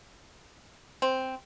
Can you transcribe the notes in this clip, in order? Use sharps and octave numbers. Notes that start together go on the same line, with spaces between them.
C4